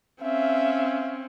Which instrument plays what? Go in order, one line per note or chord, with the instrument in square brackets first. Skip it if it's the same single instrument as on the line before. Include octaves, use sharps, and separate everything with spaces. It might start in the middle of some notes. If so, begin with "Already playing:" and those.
[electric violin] C4 C#4 [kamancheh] E5 F5